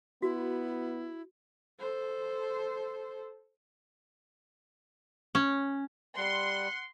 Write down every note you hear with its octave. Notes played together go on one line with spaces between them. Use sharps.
B3 E4 F#4
A4 C5
C#4
G3 F#5 C6